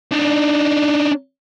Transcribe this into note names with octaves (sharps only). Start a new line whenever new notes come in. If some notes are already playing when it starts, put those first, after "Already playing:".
D4 D#4